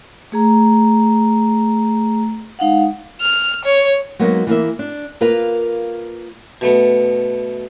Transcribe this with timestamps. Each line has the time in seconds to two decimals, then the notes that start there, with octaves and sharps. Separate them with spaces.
0.32 A3 G#4 A#5
2.59 G#3 D#4 F5 F#5
3.21 F6
3.65 C#5
4.19 F#3 G#3 A#3 B3 D#4 F#4
4.47 E3 A#3 E5
4.79 D4
5.21 A#3 F4 A#4 B4 F5
6.61 B2 A3 B3